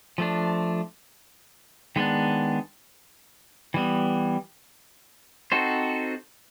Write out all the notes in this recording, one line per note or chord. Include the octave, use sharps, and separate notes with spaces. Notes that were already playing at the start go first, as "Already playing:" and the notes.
F3 A3 D4
D#3 G#3 B3 D4
E3 G3 B3
C4 D#4 F#4 A4 C5